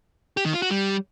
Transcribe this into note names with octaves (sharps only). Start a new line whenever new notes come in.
G4
D#3
F4
F#4
G3